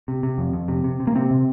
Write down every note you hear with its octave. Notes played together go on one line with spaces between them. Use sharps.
C3
C3
F2
F2
C3
C3
C3
A#3
C3 C4
C3